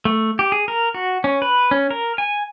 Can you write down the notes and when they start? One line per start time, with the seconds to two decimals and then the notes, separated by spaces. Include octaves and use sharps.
0.05 A3
0.39 G4
0.52 G#4
0.68 A#4
0.94 F#4
1.24 C#4
1.42 B4
1.71 C#4
1.91 A#4
2.18 G#5